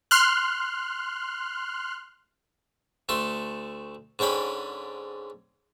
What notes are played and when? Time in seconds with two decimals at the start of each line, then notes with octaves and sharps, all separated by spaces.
0.11 C6 F6 F#6
3.09 D2 A3 A4 C6
4.19 G#2 D3 C#4 G5 B5